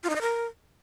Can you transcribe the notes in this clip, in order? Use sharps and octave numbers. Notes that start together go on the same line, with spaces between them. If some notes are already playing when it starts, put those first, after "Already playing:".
F4
D#4
D#5
A#4